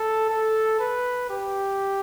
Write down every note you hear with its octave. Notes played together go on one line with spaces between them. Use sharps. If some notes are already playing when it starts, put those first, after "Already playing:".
Already playing: A4
A4
B4
G4